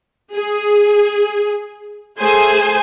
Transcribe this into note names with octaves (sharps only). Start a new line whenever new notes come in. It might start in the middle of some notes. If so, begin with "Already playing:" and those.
G#4
A3 G#4 C5 G#5